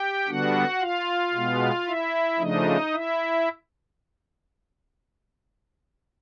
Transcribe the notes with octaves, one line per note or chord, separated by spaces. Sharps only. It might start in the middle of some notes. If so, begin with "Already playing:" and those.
Already playing: G4 G5
D3 G3 B3 D4 F#4 F#5
F4 F5
B2 G#3 B3
E4 E5
C#3 F3 A3 D4 D#4 D#5
E4 E5